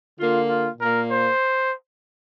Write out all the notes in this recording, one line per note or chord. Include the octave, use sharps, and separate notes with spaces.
D3 A#3 F4
F4
A#2 A#3 A#4
C5